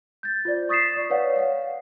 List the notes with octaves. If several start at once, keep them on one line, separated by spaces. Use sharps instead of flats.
G6 A6
F4 C5 D5
C#6 D#6 A6 B6 C7 E7
D5
B4 C#5 D5 F5 F#5
F5 F#5